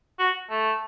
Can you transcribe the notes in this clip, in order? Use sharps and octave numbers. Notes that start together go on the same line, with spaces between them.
F#4
A3